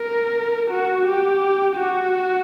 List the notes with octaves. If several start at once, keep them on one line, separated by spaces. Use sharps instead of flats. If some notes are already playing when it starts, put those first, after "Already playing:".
Already playing: A#4
F#4
G4
F#4